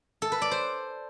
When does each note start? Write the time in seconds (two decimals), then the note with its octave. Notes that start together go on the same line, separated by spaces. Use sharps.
0.22 A4
0.32 B4
0.42 D5
0.51 C5